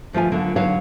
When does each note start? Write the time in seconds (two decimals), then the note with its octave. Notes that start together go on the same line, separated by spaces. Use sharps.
0.13 D3 F3 A3 F4 G#5
0.32 D3 F#3 A#3
0.56 D3 F#3 C#5 F5